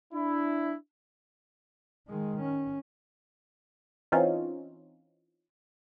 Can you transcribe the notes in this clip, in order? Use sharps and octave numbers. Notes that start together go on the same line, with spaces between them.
D4 E4
D#3 G#3
C#4
E3 C4 C#4 D#4 F4